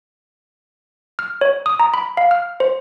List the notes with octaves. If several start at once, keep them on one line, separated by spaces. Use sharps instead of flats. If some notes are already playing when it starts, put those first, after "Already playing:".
F6
C#5
D#6
A#5
B5
F5
F6
C5